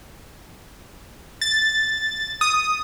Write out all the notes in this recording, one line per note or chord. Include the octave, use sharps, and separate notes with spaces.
A6
D#6